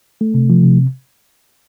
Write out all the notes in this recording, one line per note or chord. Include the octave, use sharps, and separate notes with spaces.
A3
C3
F3
C3